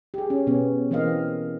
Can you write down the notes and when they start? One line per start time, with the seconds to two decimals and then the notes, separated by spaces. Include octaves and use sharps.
0.14 G4 G#4
0.30 C#4
0.47 B2 B3 C#4
0.91 E3 A#3 C4 D#5 F5